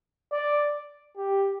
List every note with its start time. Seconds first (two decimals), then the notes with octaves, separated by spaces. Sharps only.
0.32 D5
1.17 G4